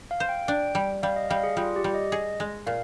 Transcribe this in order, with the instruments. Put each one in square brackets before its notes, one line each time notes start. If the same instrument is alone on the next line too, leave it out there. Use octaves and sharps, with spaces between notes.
[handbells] F5
[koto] C5
[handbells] G5
[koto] D4 [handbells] G5
[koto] G3
[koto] G3 [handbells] F5
[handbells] D#5
[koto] G3 [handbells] F5
[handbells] G#4
[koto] G3 [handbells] F4
[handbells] G4
[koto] G3
[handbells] D#5
[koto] G#4 [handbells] D#5
[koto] G#3
[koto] A#2 [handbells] F5